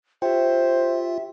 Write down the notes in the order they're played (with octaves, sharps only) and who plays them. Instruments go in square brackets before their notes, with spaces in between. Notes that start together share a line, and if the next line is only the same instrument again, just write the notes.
[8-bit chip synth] F4 [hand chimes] G4 G5 [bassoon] C5 [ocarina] E5